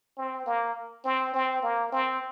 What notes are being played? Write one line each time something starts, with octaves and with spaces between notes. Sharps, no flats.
C4
A#3
C4
C4
A#3
C4